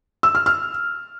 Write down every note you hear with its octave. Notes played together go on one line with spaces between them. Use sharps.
E6
F6
F6